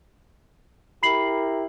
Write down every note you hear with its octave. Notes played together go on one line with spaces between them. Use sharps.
E4 G4 A#4 B5 C7 F#7